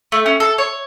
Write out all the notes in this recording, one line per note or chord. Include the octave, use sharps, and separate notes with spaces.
A3
C#4
A4
C#5